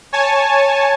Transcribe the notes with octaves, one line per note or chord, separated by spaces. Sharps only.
C#5 G#5 A5